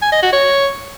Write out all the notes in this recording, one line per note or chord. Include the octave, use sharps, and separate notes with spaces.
G#5
D#5
F#4
C#5